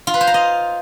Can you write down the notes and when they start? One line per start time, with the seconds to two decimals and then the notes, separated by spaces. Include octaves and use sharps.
0.07 F4
0.14 B4
0.21 C5
0.27 A#5
0.34 D#5